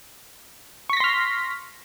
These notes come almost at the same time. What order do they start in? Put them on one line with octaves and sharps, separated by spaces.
C#6 B6 A#6 C6 F6